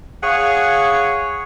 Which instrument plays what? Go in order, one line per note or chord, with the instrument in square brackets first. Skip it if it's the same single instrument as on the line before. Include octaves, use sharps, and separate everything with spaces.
[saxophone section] G#4 C#5 F5 F#5